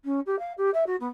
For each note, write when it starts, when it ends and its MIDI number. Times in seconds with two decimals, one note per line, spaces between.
0.04 0.20 61
0.26 0.38 67
0.39 0.52 77
0.57 0.70 67
0.73 0.83 76
0.86 0.96 66
1.00 1.07 59